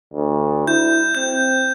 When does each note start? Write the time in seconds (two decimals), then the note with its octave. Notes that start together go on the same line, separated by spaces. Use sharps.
0.14 D2
0.67 E4 G6
1.15 C4 G6